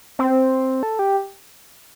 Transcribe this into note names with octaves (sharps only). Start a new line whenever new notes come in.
C4
A4
G4